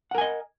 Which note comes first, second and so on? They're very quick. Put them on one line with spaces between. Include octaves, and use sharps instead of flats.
F#5 A#4 G#5 D#5